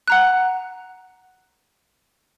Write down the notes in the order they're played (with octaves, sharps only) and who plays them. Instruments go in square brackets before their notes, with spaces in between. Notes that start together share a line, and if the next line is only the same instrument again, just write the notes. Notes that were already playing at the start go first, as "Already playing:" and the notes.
[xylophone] F#5 A#5 F#6